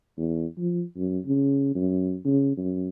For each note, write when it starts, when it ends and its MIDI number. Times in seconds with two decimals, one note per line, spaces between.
0.18 0.46 40
0.58 0.82 53
0.97 1.19 42
1.26 1.73 49
1.75 2.16 42
2.25 2.52 49
2.57 2.89 42